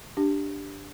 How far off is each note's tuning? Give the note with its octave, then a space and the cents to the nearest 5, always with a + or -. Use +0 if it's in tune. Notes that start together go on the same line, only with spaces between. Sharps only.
D4 +0 G4 +0